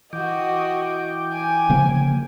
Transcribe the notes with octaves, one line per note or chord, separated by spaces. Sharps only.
E3 F#4 D#5 G5 D6
G#5
C#3 F3 A#3